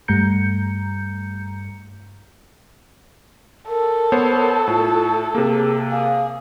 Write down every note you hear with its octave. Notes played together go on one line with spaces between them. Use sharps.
G2 G3 A3 A#5 G6 C#7
A4 A#4
B3 C5 C#5
A2 F4
C3 A#3 G#4
G#4 F5